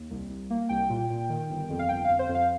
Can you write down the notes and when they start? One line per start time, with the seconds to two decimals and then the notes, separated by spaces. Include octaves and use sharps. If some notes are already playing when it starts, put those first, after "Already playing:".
Already playing: D#2
0.11 C2
0.30 C2
0.50 A#3
0.69 C2 G5
0.90 A#2
1.10 A#2
1.29 D#3
1.50 G1
1.70 F2
1.79 F5
1.89 G1 G5
2.04 F2 F5
2.19 C5
2.29 F2
2.35 F5